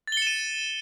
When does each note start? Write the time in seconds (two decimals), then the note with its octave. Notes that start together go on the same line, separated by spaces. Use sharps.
0.07 A6
0.12 G7
0.17 C#7
0.22 E7
0.27 D#7